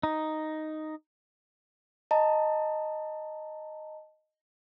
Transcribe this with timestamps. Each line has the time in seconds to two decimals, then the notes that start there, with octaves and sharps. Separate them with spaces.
0.03 D#4
2.11 D#5 A5 A#5